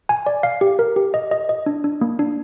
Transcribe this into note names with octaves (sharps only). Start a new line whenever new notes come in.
G#5
D5
F5
G4
A#4
G4
D#5
D#5
D#5
D4
D4
A#3
D4